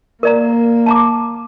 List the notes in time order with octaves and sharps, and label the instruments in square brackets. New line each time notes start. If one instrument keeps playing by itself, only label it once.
[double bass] A#3 [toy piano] A#4 D5 A#5
[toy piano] A5 A#5 D6